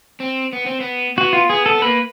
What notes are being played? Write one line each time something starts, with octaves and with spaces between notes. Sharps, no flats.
C4
B3
C4
B3
B3 F#4
F4
B3 G#4
A4
B3
A#3 B4